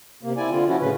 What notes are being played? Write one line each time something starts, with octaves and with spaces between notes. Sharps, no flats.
C3 A#3
C4 E4 D5 G#5
D3 F4
F3 C#4 E4 F#4
A2 C#3 C#4 B4